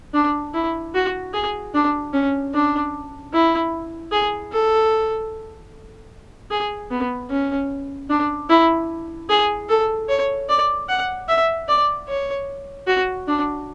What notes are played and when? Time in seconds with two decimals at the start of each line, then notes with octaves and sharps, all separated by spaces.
0.14 D4
0.54 E4
0.95 F#4
1.34 G#4
1.74 D4
2.13 C#4
2.54 D4
3.33 E4
4.12 G#4
4.52 A4
6.51 G#4
6.91 B3
7.30 C#4
8.10 D4
8.50 E4
9.30 G#4
9.69 A4
10.09 C#5
10.49 D5
10.89 F#5
11.28 E5
11.68 D5
12.09 C#5
12.87 F#4
13.28 D4